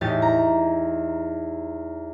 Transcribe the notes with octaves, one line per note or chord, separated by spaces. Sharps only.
E2 A2 D#4 G4 A6
A#5